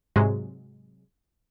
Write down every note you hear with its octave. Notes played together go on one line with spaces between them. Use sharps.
G#2 C3 F#3 G#3